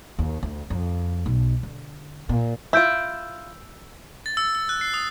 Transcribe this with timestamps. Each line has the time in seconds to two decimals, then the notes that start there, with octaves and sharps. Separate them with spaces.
0.19 D#2
0.43 D2
0.70 F2
1.26 B1
1.63 D3
2.29 A#2
2.73 E4 F4 E6 G6 D7
4.26 A6
4.37 E6
4.55 E6
4.69 F#6
4.81 C7
4.94 D#6